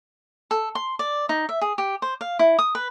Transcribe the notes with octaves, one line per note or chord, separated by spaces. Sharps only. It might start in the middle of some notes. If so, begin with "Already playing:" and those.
A4
C6
D5
D#4
E5
G#4
G4
C5
F5
E4
D#6
B4